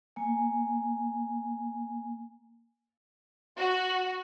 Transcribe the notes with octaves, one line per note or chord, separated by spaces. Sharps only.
A#3 G#5
F#4